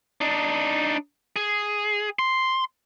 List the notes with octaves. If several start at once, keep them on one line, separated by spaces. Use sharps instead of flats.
D4 D#4
G#4
C6